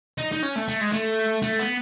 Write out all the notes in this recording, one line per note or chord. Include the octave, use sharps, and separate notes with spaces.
D#4
D#4
C#4
A3
A3
G#3
A3
A3
B3